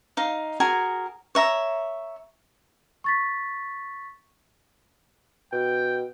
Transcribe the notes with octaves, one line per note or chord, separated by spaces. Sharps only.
D#4 F5
F#4 G#4 A#4 G#5
C#5 E5 A#5
C#6 A6 B6
B2 G5